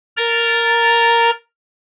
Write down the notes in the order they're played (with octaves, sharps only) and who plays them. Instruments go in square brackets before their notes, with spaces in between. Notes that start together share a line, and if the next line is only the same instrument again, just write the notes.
[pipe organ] A#4 A#5 A6